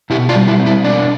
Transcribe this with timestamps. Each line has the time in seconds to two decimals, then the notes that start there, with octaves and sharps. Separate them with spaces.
0.10 B2 E4 G4
0.29 D4 F4
0.35 G3
0.48 E4
0.60 C4
0.66 E4
0.84 B2 D4